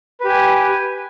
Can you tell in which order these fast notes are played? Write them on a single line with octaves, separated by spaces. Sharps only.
B4 G4 G#5